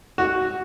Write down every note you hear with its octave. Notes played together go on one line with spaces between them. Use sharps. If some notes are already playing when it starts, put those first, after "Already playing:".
F#4